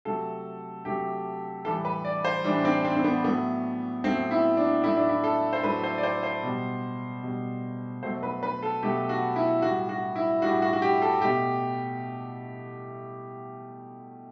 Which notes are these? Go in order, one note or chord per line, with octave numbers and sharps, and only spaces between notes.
C3 F#3 A3 A4
C3 F#3 A3 G4
A2 E3 G3 A4
B4
D5
C5
A2 E3 G3 D4
C4
C4
C4
B3
A2 F#3 A3 B3
A2 F#3 A3 C4
E4
D4
A2 F#3 A3 E4
D4
E4
A4
C5
A2 F#3 A3 B4
C5
D5
C5
C5
B2 G3
B2 G3
B2 F#3 A3 C5
B4
B4
A4
B2 F#3 A3 G4
F#4
E4
A2 G3 F#4
F#4
E4
A2 G3 F#4
F#4
F#4
G4
A4
B2 A3 G4